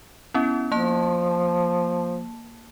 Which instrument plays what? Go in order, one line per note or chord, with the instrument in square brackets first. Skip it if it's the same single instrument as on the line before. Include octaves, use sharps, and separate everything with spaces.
[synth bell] B3 C#4 E4
[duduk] F3 [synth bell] A#3 A5